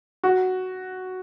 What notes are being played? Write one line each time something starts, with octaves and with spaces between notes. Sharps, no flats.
F#4